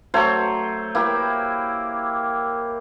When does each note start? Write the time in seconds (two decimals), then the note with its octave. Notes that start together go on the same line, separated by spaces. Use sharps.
0.14 F#3 A3 C5 C#5
0.95 A#3 E4 G4